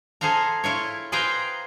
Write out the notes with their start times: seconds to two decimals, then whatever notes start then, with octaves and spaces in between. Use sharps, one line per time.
0.21 G#4 A4 C5 F5 A#5
0.64 E4 F4 C#5
1.12 G#4 B4 C5 F5 G5 A#5